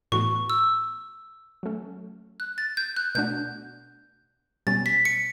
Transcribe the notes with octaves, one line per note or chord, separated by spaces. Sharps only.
A2 E3 B3 F#4 C#6
E6
F#3 A3 C#4
F#6
A6
G6
F#6
B2 A3 D4 F#4 G6
B2 G3 C#4 A6
B6
C#7